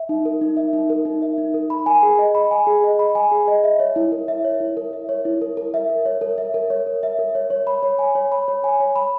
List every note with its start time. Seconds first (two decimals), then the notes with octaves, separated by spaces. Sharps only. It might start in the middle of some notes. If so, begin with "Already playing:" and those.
Already playing: E5
0.09 D#4
0.25 A#4
0.41 D#4
0.57 E5
0.73 D#4
0.90 A#4
1.05 D#4
1.22 E5
1.38 D#4
1.54 A#4
1.70 B5
1.86 G#5
2.03 G#4
2.19 D#5
2.35 B5
2.51 G#5
2.67 G#4
2.84 D#5
2.99 B5
3.15 G#5
3.32 G#4
3.48 D#5
3.64 E5
3.80 C#5
3.96 E4
4.12 A#4
4.28 E5
4.45 C#5
4.61 E4
4.77 A#4
4.93 E5
5.09 C#5
5.25 E4
5.42 A#4
5.57 A#4
5.74 E5
5.90 A#4
6.06 C#5
6.21 A#4
6.38 E5
6.54 A#4
6.70 C#5
6.87 A#4
7.03 E5
7.19 A#4
7.35 C#5
7.50 C#5
7.67 B5
7.83 C#5
7.99 G#5
8.15 C#5
8.32 B5
8.48 C#5
8.64 G#5
8.80 C#5
8.96 B5